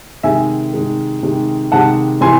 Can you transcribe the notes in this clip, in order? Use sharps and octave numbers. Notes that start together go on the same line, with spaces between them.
C3 D#3 G#3 E5 G#5
C3 D#3 G#3
C3 D#3 G#3
C3 D#3 G#3 F#5 A5
C3 E3 G#5 C6